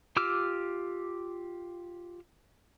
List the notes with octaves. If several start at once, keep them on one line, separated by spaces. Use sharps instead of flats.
F4 G4 D6 E6 F6